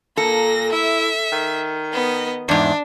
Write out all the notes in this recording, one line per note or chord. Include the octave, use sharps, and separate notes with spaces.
A#2 A#3 A4 A#6
E4 E5
D#3
B3 D#5
E2 G#2 D4